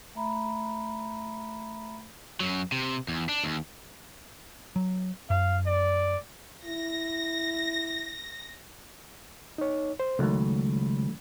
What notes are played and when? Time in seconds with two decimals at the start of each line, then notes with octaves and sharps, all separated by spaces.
0.15 A3 E5 A#5 B5
2.40 F#2 F#3
2.72 C3
3.08 E2
3.29 D4
3.44 D#2
4.76 F#3
5.30 F#2 F5
5.66 D5
6.65 E4 A#6
9.58 D#4 C#5
10.00 C5
10.19 C#2 D#3 F#3 A3